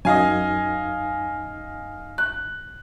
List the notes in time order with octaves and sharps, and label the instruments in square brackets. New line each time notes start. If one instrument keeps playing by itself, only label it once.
[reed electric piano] F#2 D#4 [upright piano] D#5 F5 G#5
[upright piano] F#6